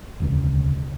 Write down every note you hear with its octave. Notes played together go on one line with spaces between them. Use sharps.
E1 D2 C#3